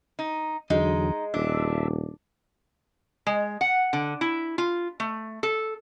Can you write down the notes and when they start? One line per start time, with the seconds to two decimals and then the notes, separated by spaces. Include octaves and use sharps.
0.19 D#4
0.70 E2 D3 F#3 G#3 D#4
1.34 D#1 D4 E5
3.27 G#3
3.61 F#5
3.93 D3
4.21 E4
4.58 F4
5.00 A3
5.43 A4